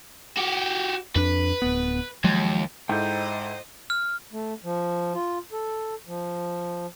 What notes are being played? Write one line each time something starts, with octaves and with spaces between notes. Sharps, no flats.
F#4 G4
F2 D4 B4
D1 B3
D#2 F3 F#3 G#3
G#2 E4 A4 C5 D#5 G5 A#5 G6
F6
A3
F3
F4
A4
F3